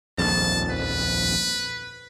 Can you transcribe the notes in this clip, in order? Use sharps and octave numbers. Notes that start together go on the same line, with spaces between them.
D#1 A#1 F2 A5
B4